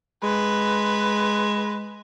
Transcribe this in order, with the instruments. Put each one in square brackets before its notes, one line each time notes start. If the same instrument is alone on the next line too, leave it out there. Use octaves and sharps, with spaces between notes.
[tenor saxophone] G#3 [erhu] B4